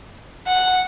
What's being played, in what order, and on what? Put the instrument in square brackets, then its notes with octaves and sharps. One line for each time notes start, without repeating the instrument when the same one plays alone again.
[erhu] F#5